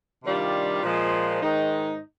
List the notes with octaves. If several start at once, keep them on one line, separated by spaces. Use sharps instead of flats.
C3 D#3 G3 D4 F4
A#2 F3 G#3
G#2 D#3 G#3 D#4